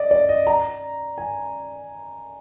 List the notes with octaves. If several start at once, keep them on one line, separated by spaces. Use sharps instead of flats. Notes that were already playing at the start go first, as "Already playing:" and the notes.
Already playing: D5 D#5
D5
D#5
A#5
G#5